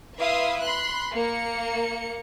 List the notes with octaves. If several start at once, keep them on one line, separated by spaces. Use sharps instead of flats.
E4 B4 E5 F5 C6 D#6
B5 C6 F#6
A#3 C#7